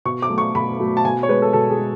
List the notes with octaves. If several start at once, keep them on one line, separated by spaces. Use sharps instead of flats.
B2 C#6
D6
F#3 A3
C#6
B2 B5
F#3 A3
A5
B2 G#5
C#5
G#3 B4
A4
B2 A4
G#4
G#3